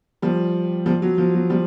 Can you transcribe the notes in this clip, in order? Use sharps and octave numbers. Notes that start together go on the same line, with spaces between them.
F3 G3
F3 G3
F#3
F3
F#3
F3 G3